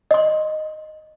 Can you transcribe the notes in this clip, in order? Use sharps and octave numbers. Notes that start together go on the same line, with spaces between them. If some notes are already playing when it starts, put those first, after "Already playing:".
D#5 C6